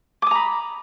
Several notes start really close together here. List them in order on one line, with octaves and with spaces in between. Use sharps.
D6 D#6 A#5 B5